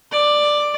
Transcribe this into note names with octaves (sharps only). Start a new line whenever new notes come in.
D5